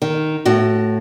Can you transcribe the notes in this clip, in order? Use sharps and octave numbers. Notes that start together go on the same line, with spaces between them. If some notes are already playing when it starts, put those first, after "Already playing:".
D#3
A2 F#4